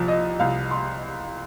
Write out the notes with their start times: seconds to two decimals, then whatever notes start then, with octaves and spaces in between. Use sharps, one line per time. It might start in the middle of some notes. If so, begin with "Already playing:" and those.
Already playing: C2 F3
0.08 D#5
0.40 C2 F5
0.71 C6